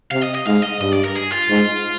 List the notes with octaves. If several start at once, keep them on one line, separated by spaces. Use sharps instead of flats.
C3 F5
D#5
D#5
G#2 F5
D#5
G2 D#5
D5
A#4
G#4
F4
G#2